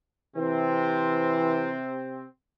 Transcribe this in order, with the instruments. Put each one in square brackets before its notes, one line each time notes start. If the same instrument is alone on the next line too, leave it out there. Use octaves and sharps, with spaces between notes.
[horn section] C3 C4 [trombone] E3